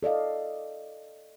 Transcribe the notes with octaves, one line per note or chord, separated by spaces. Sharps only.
A4 D5 D#5 F5